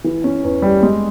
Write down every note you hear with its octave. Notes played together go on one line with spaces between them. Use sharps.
E3
C#4
E2
G3
G#3